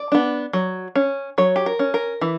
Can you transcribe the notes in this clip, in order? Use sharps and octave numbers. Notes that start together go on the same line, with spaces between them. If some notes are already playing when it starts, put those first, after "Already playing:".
Already playing: D5
B3 D4
F#3
C#4
F#3 C#5
G4
A#4
C#4
A#4
E3